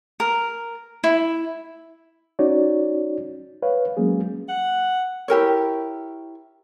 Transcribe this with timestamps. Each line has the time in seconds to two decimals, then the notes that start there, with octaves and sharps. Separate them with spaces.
0.20 A#4
1.04 E4
2.39 C#4 D#4 F#4 C#5 D5
3.62 B4 C#5 F5
3.97 F#3 G#3 A#3 C#4 G#4
4.49 F#5
5.28 E4 G4 A#4 C#5